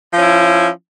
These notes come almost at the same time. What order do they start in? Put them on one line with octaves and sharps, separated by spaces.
F3 C#4 E4